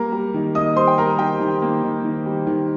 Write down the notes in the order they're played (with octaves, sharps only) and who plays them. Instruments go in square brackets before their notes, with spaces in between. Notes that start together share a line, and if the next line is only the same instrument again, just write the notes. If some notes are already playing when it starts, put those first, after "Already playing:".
Already playing: [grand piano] G3 A#3 A#4 A#5
G3
D#3
A#3 D#5 D#6
G3 C5 C6
G5
G3 A#4 A#5
D#3 G4 G5
D#3
A#3
D#3
D#3
G3
D#3